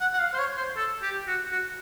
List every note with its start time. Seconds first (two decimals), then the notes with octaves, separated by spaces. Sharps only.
0.01 F#5
0.14 F#5
0.19 F5
0.33 C5
0.39 C#5
0.57 C5
0.77 A4
1.02 G4
1.27 F#4
1.52 F#4